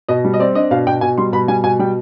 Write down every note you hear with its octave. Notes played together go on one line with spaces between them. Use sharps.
B2 D#5
G3
D#5
C4 D5
D4 D#5
B2 F5
B2 G5
B2 G#5
G3 C6
B2 B5
G3 G#5
B2 G#5
G3 G5